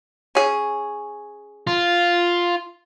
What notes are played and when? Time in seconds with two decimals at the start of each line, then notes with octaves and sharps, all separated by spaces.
0.35 C#4 G#4
1.67 F4